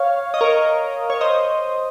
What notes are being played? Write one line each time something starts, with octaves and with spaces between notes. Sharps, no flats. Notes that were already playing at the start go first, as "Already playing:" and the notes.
Already playing: C#5 F5
D#5
A#4 C#5
C#5
C5 D#5